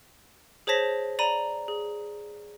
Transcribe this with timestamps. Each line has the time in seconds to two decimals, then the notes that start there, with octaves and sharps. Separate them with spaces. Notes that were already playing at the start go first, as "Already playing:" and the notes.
0.67 G#4 C5 C#5 A5 A#6 B6
1.19 D5 A#5 B5 D#7
1.68 G#4